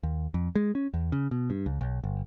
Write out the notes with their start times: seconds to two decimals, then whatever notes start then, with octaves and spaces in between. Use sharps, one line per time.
0.03 D#2
0.34 F2
0.55 G#3
0.75 C#4
0.94 E2
1.12 C#3
1.31 B2
1.50 G2
1.66 C#2
1.81 B1
2.04 G1